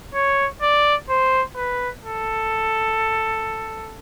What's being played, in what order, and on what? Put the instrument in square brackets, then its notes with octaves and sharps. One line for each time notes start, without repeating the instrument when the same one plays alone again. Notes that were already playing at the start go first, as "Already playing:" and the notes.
[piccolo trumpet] C#5
D5
C5
B4
A4